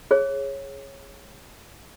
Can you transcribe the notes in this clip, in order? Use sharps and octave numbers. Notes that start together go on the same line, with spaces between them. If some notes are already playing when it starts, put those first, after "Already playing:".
G#4 C#5